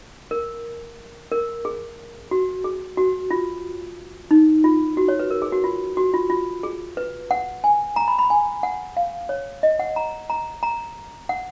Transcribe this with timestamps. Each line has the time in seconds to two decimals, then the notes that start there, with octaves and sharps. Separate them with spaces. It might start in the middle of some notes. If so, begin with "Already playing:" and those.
0.31 A#4
1.32 A#4
1.65 G#4
2.31 F#4
2.64 G#4
2.97 F#4
3.31 F4
4.31 D#4
4.64 F4
4.97 F#4
5.08 C#5
5.19 B4
5.31 A#4
5.42 G#4
5.52 F#4
5.64 F4
5.97 F#4
6.14 F4
6.30 F4
6.63 G#4
6.97 B4
7.31 F#5
7.64 G#5
7.96 A#5
8.08 B5
8.19 B5
8.30 G#5
8.63 F#5
8.97 F5
9.29 C#5
9.63 D#5
9.79 F#5
9.96 A#5
10.30 A#5
10.63 A#5
11.29 F#5